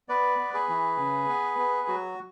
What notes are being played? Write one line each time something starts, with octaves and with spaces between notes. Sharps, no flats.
B3 B4 D5
B3
G#4 B4
E3
C#3
B3
B3
F#3 F#4